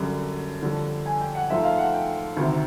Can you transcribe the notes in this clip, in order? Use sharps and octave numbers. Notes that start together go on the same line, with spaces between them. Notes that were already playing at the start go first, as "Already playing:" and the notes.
Already playing: F#2 D3 G3
F2 D3 G3
G#5
G5
F#5
G#2 F3 A3 E5
F5
F#5
G5
D2 C3 D#3